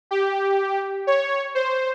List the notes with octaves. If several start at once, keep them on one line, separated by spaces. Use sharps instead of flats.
G4
C#5
C5